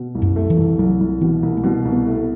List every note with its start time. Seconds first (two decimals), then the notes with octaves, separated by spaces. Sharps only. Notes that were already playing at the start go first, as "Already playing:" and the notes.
Already playing: B2
0.15 C2
0.22 F#2
0.36 A3
0.50 E3
0.57 C2
0.79 C2 F#3
1.00 C2
1.21 B2 E3
1.43 C2
1.57 A3
1.64 B2 G3
1.85 C2
1.92 B3
2.07 A3